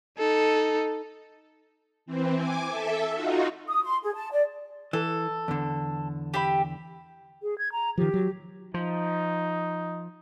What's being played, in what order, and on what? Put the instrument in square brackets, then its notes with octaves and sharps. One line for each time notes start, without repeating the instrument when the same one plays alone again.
[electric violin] D#4 A4
[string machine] E3 C4
G#5 D6
A4 E5
D#4 F4 F#4
[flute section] D#6
C6
G#4
A5
D5
[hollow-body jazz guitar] E3 [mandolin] A4
[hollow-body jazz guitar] E2 D3
[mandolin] G4 E5 B5
[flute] G#4
G#6
A#5
[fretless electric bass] D#3 F3 [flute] G4
[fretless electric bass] F#3
[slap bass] F3 [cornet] D#4